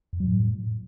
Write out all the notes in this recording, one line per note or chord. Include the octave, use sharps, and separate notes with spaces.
F2
F#3
A2